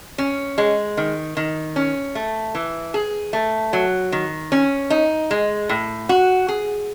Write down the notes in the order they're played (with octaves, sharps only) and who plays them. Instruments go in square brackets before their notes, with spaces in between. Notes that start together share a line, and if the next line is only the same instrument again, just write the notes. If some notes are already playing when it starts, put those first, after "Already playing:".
[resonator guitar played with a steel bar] C#4
G#3
D#3
D#3
C#4
A3
E3
G#4
A3
F#3
D#3
C#4
D#4
G#3
A2
F#4
G#4